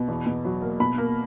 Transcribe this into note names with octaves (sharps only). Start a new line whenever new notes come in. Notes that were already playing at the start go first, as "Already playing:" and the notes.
Already playing: B2
E2
B2
F#3
A#3
B2 B5
A#3